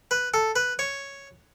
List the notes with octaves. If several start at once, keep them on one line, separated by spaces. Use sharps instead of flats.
B4
A4
B4
C#5